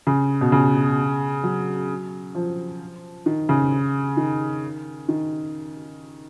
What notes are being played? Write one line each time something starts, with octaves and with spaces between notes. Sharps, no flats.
C#3
B2
C#3
F#3
F3
D#3
C#3
D#3
D#3